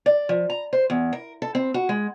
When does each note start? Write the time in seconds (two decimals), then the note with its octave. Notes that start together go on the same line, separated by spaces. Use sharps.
0.06 D5
0.29 F3
0.50 A#5
0.73 C5
0.90 E2
1.13 A#4
1.42 A4
1.55 C4
1.74 F#4
1.89 G#3